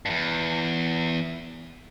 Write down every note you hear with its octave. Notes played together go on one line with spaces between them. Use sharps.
E2 G2